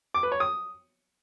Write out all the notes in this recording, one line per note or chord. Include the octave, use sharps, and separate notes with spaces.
D6
B4
C#5
D#6